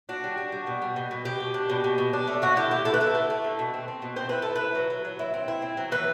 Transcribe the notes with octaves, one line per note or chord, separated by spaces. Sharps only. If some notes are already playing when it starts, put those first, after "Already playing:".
D4 F#4
G3
D4
G3
B2
G3
B2
B2
B2 G4
B2
D4
B2
B2
B2
D4
A3
D3 F#4
E4 G4
D3 G4
E4 A4
B4
E4 A4
A3
A3
D3
B2
C4
C4
B2
C4 C5
E4 B4
E4 A4
E4 B4
F#3
F#3
F#3
E4
C4
E4
C4
F#3
E3 B4